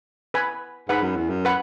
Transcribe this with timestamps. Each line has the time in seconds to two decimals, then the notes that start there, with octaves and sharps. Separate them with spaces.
0.34 B4 G#5 B5
0.89 G#2 B4 F#5 B5
1.02 F#2
1.16 E2
1.29 F#2
1.45 B4 F#5 B5